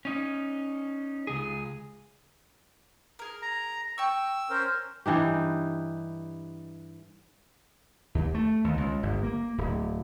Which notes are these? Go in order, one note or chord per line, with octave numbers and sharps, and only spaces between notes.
C#4 D#4
C#2 G#4
G#4 A#4
A#5
G5 C#6 E6
C#4 A#4 C5
G2 E3 D#4 G4
D#2
A3
D#2
C#2
G1
A#3
D1